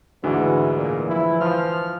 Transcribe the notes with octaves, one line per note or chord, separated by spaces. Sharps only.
D2 G#2 E3 F#4 G#4
A#2 E3
F3 E4
F3 F6